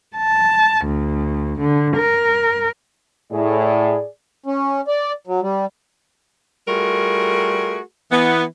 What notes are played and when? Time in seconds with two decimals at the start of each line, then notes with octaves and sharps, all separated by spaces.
0.15 A5
0.85 D2
1.60 D3
1.96 A#4
3.32 A2 G#4 D5
4.46 C#4
4.88 D5
5.27 F#3
5.42 G3
6.68 G3 A3 F4 F#4 G#4 A#4
8.11 E3 B3